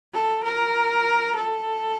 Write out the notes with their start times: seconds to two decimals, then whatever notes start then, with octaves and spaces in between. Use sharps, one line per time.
0.13 A4
0.44 A#4
1.36 A4